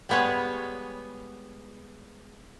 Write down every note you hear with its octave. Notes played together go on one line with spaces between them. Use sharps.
G3 G#3 B3 G#4 C#5